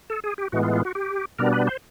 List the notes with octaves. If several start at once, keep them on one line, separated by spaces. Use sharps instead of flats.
A4
G#4
G4
A2 E3 G#3 B3 F#4
F4
F4
F#4
G4
B2 G3 B3 D4 A#4
B4
C5